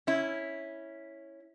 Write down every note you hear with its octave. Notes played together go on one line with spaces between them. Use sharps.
C#4 E4